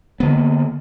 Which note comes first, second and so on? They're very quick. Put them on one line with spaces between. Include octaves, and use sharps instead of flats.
B3 D3 A#3